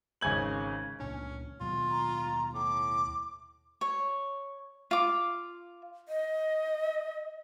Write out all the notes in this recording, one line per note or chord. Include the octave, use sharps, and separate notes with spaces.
G#1 C#3 G#5 G#6 F#7
C#2 A#2 C#4 D4
D#2 B2 F#3 F4
A#5
A2 D6
C#5
F4 D6
D#5